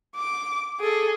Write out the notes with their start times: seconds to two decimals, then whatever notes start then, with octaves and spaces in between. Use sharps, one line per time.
0.16 D6
0.80 G#4 A4